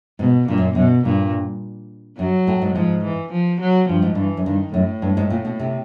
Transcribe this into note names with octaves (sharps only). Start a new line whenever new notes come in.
G#2 B2
G2 A#2
F#2
F#2 B2
G2 A#2
F#2 F#3
A2
G#2
G#2 F3
E3
F3
F#3
G2 F3
G#2
G2 E3
F#2
G2 D#3
F#2 A2
G2
G#2
A#2
B2
C3